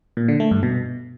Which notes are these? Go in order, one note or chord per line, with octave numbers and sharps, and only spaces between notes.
A#2
D3
A3
G2
B2